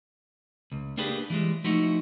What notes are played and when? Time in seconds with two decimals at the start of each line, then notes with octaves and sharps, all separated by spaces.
0.72 C#2
0.97 A#3 D4 G4 G#4 B4
1.30 E3 G3 G#3
1.64 F3 A3 D#4 E4 F#4